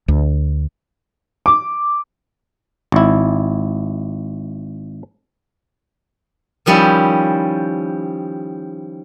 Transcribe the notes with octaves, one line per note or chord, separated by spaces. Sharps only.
D2
D6
G#1 E4
D#3 F3 G3 C#4 E4